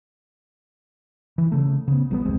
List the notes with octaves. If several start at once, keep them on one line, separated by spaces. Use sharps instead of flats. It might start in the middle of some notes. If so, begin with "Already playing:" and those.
E3
C#3 A3
C#3 B3
A1 G3 A3 B3
F1 D2 G#3 C4